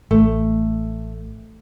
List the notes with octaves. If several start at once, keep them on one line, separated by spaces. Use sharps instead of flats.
A1 A3